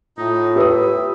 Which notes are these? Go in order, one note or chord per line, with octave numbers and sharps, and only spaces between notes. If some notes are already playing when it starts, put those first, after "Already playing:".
A2 D#4 F4
G4 B4 E5 D#6